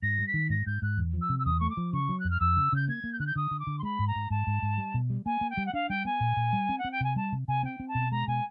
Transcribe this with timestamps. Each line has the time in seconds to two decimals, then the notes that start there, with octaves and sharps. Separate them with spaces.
0.02 G#2 A#6
0.18 G3
0.27 B6
0.34 D#3
0.50 G#2 A#6
0.66 G#2 G6
0.82 G#2 F#6
0.97 E2
1.13 F3
1.21 E6
1.29 C3
1.39 E6
1.45 E2 D#6
1.60 A3 C#6
1.70 D6
1.77 F3
1.93 C#3 C#6
2.09 F#3
2.19 F#6
2.24 F2
2.30 F6
2.40 F2 E6
2.57 C#3
2.72 C#3 G6
2.88 A#3 G#6
3.04 A#3
3.12 G6
3.19 D3 F#6
3.26 G6
3.36 D3 D#6
3.51 D3
3.59 D6
3.67 D3
3.79 C6
3.83 G#3 B5
3.99 G#2
4.07 A#5
4.15 G#2
4.30 G#2 A5
4.47 G#2
4.62 G#2
4.78 G3
4.94 B2
5.10 G3
5.25 A#3 G#5
5.41 A#3
5.50 G5
5.57 G3
5.66 F#5
5.74 D4 F5
5.89 G3 G5
6.05 B3 G#5
6.20 A#2
6.36 A#2
6.53 G3
6.69 C4
6.78 F#5
6.84 C4
6.91 G5
7.00 C3 G#5
7.16 G3 A5
7.32 C3
7.48 C3 G#5
7.63 C4 G5
7.80 C4
7.88 A5
7.95 B2
8.11 G#3 A#5
8.27 B2 G#5